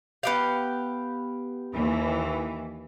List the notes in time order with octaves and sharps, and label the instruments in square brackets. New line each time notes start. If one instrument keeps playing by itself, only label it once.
[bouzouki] B3 G4 F5
[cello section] D#2 E3